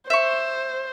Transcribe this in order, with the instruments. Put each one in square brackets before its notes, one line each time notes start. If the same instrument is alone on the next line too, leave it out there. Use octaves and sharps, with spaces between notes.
[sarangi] C5 [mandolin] E5 C#6